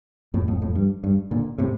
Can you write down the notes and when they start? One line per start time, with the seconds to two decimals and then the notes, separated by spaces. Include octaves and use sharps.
0.34 F2 A2
0.48 F2 A2
0.62 F2 A2
0.75 G2
1.04 G2
1.31 A#2 D3
1.58 A2 C3